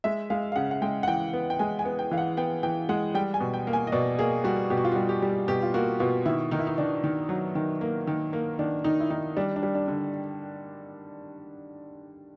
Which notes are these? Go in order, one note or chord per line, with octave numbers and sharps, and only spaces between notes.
G#3 E5
G#3 F5
F5
C#3 F#5
F#5
G#3 G5
F#5
E3 G5
B3
G5
G#3 G#5
G#5
B3
G5
E3 F5
F#5
B3 G5
E3 G5
G#3 F#5
G3 G5
G#5
B2
G5
A#3
G#5
D#5
B2 D5
A#3 G#4
G3 F#4
B2 G4
F#4
F4
F#4
G3
G4
G3
B2 G4
F4
A#3 F#4
B2 F4
D#3 E4
D#3 D#4
E4
D#4
D#3 D4
D#3
F#3
D#3
A#3
D#3
A#3
D#3 D4
D#3 D#4
E4
D#3 D#4
G3 D4
D4
G3
D4
D3